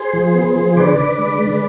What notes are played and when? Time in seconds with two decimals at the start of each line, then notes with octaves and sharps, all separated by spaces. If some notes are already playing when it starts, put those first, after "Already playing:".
Already playing: G#4 C5
0.13 F3
0.35 B3
0.56 F3
0.76 D3 B4 D5
0.97 D3
1.18 G#3
1.40 G#3